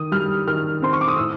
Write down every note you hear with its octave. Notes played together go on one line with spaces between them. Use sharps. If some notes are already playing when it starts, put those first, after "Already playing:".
Already playing: D#3 D#6
G3 F6
D#3 F6
C4 C6
C#6
D6
D#6
A2 E6